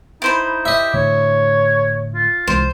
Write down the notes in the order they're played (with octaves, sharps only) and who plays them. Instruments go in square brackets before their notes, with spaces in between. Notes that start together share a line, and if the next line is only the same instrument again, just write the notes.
[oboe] D#4 [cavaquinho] E4 C5 B5
[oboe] G4 [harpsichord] D#5 E5
[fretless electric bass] A2 D3 A3 [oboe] C#5
[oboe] F4
[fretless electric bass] C2 E3 G#3 [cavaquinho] C5